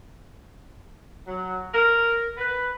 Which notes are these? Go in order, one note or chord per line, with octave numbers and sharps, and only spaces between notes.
F#3
A#4
B4